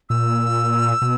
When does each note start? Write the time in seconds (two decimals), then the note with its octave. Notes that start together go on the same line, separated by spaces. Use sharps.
0.09 A#2 E6
1.02 B2